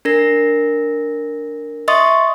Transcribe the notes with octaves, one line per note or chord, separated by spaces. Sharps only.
D4 A#4 A#6
D#5 E5 C6 C#6 D#6 A6